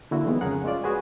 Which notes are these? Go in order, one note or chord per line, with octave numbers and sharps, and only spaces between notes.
D3 A#3 E4 F#4
D#3 F3 G#3 B3
F2 C#3 C#4 G#4 A#4 F#5
G#3 C#4 F4 D5
F#4 G#4 B4 G#5